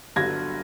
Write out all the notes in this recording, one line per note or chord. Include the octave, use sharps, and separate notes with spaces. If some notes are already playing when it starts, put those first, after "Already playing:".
G1 G2 D3 F#3 G#6 A#6